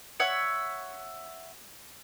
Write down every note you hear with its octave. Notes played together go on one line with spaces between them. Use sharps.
C#5 E5 F#5